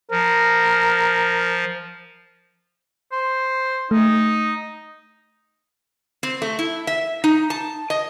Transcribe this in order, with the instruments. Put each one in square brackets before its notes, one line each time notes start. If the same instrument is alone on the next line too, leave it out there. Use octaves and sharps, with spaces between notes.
[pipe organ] F3 [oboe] A#4
[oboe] C5
[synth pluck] A3 [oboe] D#4
[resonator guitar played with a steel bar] C4
A3
E4
E5
D#4
A5
D#5